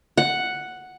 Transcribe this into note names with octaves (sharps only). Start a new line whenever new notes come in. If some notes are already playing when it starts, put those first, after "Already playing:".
F#5